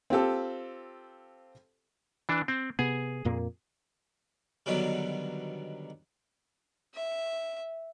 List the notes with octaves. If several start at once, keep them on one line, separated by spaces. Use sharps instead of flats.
C4 F4 G4 A4
E3 D4
C4
C3 B3 G#4
F2 A#2 A#3
B2 D3 D#3 F#3 G3
E5